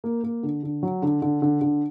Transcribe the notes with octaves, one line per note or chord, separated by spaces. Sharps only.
A#3
A#3
D3
D3
F#3
D3
D3
D3
D3